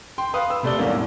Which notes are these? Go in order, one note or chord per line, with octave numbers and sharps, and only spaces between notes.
G5 C6
B4 F5 D#6
E6
C3 A3 D5 G7
E2 G#2 G3 A#3 C#4
A2